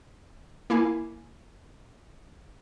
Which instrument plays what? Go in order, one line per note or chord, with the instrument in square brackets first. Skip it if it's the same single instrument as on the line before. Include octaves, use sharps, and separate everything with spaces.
[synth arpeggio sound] A#3 E4 F5 G#5